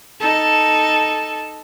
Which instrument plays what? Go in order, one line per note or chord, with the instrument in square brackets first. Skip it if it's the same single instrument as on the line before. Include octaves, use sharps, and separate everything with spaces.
[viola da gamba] D#4 A4